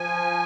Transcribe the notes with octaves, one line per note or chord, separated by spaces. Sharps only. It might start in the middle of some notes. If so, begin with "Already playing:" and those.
Already playing: F3 G#5